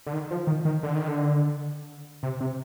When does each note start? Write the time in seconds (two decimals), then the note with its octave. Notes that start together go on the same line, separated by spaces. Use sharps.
0.06 D3
0.13 D#3
0.31 F3
0.47 D#3
0.65 D#3
0.83 D3
0.95 D#3
1.08 D3
2.23 C3
2.40 C3